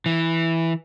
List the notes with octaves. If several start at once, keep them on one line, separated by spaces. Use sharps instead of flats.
E3